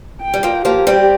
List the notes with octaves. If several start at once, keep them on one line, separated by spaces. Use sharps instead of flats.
G5
G3
F3 A#3
F3 A#3 G4
G3 C4